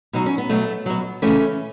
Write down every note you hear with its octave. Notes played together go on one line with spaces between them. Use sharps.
B2 F#3 D#4
C#4
B3
B2 F#3 A3
B2 F#3
C#3 E3 A3 C#4